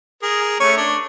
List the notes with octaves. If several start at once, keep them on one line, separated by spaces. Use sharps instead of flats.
G#4 A#4
A3 C#4 C#5
D4